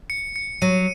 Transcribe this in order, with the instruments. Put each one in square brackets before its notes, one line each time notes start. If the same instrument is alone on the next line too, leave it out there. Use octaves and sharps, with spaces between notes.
[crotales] C#7
C#7
[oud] F#3 [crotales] D#7